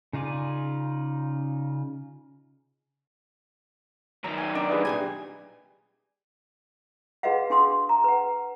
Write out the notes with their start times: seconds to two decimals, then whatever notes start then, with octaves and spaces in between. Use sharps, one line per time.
0.13 C#3 D#4 F4 D5 G#5
4.24 F#2 D#3 A#5
4.38 G#5
4.55 D4 D#4
4.70 E3 G#4 B4 D#5
4.85 A#2 G3 C#4 G#5
7.23 F#4 G#4 B4 D#5 F5 F#5
7.50 D4 G#4 C6 D#6
7.89 A#5
8.04 B4 F#5